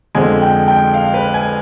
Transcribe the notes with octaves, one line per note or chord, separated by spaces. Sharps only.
F2 D3 G#3 G#5
G5
G5
F5
B4
G#5